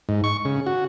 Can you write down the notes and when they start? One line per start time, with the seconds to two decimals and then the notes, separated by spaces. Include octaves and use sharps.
0.09 G#2
0.24 C#6
0.45 C#3
0.66 F#4